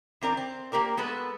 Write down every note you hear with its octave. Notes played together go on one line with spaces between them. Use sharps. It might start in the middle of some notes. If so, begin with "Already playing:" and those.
E2 C4 A#4 D5
C4
A#3 G4 A#4 D5
G#3 B3 A4 B4